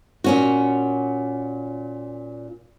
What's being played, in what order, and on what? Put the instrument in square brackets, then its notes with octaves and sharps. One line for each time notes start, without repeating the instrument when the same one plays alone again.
[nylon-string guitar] A#2 C#4 F#4